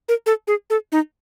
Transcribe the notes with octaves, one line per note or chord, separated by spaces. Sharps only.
A#4
A4
G#4
A4
D#4